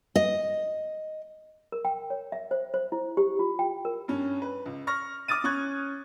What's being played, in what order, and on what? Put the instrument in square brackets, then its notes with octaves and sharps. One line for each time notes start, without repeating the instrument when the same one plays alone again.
[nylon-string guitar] D#5
[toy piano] A#4
G5
C#5
E5
C5
C5
E4
G4
F4
G5
A#4
[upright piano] G2 C#4
B4
C#2
C#6 F6 A#6
D6 D#6 F6 A6 D#7
C#4 C#6 F#6 G#6